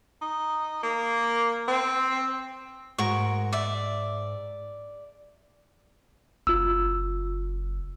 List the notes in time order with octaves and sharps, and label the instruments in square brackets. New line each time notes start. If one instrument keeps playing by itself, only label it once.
[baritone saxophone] D#4
A#3
C4
[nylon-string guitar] G#2 [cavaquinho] F#4 A#4 C#6
[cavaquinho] D5 E5
[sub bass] F#1 [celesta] F4 E6